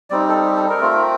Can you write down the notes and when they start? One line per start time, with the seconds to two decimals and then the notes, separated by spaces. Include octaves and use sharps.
0.10 G3 C4 D#4 D5
0.29 A4
0.46 G4
0.56 A4
0.69 A#4
0.80 A3 C4 F4